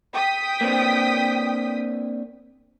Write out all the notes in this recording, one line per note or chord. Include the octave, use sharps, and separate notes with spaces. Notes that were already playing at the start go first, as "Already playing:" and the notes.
G5 D#6 B6
A#3 C4 D4